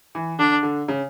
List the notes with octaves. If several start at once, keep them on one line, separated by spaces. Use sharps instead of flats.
E3
D3 D4
D3
C#3